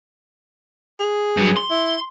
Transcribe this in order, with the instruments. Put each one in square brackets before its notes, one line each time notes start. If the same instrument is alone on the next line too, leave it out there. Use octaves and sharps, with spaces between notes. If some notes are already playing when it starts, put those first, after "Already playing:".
[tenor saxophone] G#4
[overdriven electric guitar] G2 F#3
C6
[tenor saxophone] E4